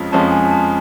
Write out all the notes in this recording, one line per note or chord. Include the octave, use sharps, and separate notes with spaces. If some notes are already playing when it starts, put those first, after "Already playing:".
Already playing: F2 F3 G#3 C#4
F2 F3 G#3 C#4 A5
G#5
A5